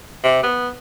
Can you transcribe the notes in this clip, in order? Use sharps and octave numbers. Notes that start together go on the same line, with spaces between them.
C3
B3